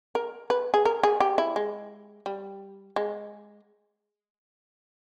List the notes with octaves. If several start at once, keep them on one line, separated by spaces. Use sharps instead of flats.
A#4
B4
G#4
A#4
G#4
G4
E4
G#3
G3
G#3